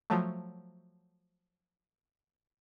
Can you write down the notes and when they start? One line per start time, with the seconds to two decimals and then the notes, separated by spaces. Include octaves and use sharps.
0.10 F3 F#3 A3